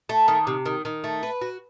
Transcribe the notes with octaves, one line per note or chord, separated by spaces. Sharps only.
A3
D#3
C3
D#3
D#3
A3
B4
F#4